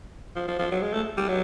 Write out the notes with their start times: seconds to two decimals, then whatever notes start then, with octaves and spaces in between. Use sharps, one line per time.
0.36 F3
0.48 F3
0.59 F3
0.71 F#3
0.82 G#3
0.93 A3
1.17 G3
1.28 F#3